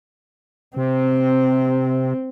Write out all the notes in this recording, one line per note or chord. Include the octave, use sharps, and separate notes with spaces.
C3 C4